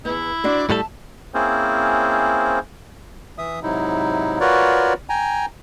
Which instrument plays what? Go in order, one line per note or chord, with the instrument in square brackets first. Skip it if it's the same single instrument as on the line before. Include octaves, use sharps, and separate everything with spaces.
[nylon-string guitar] E2 B3 [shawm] E4
[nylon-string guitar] D4 F#4 C5 [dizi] D5
[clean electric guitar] A2 G3 A4 [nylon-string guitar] E5 F#5 [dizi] A5
[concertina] A#3 C4 C#4 E4 G#4 C5
[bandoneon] E3 E5 D#6
G#2 C3 F#3 D#4 E4
F4 F#4 A#4 B4 C#5 D5
G5 G#5 A#5